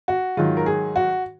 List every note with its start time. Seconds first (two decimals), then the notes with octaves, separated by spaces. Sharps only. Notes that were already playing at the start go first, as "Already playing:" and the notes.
0.08 F#4
0.37 G#2 D#3 F#3 F4
0.57 A#4
0.66 G#4
0.96 F#4